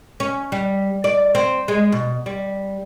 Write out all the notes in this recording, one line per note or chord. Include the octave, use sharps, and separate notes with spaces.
C#4
G3
D5
C4
G#3
B2
G3